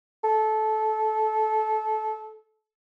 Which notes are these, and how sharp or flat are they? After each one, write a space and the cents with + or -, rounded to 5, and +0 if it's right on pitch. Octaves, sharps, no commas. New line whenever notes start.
A4 -20